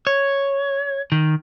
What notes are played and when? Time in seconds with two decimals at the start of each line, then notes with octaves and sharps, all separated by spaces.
0.07 C#5
1.12 D#3